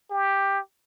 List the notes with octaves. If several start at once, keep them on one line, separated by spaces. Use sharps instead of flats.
G4